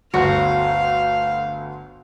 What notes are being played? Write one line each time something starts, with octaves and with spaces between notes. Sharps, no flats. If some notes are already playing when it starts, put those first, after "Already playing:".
G1 D2 F#4 F5 C#7